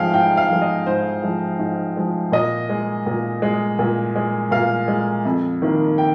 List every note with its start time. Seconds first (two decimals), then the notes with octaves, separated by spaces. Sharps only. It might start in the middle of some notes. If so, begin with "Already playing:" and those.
Already playing: G#2 F3 G#3 F5 G5
0.14 G#2 G5
0.37 F5
0.50 F3 G#3
0.62 D#5
0.86 G#2 C5
1.23 F3 G#3
1.59 G#2
1.97 F3 G#3
2.32 A#2 D#5
2.69 G#3
3.06 A#2
3.42 G#3
3.79 A#2
4.15 G#3
4.51 A#2 F5
4.88 G#3
5.25 F2
5.62 D#3 A#3
5.98 G5